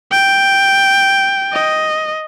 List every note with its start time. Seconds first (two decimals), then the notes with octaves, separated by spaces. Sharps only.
0.11 G5
1.53 D#5